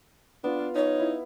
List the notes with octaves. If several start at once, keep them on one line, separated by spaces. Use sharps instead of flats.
B3 D4 F4
F5
D#4 C#5
E4